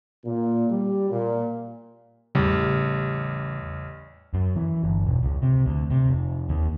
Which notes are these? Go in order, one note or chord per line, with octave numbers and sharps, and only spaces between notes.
A#2
G3
A#2
A1 E2 C#3 G3
F#2
E3
G1
E1
C#2
C3
D2
C3
F1
D#2